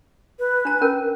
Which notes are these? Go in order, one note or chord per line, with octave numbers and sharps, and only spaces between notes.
B4
D4 A#5
C#4 A#4 A#5